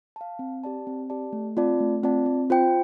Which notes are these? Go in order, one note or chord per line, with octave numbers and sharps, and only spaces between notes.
F5 A5
C4
G4 D5 A5
C4
G4 D5 A5
A3
C4 F4 D5 A5
A3
C4 F4 D5 A5
C4
F4 C5 G5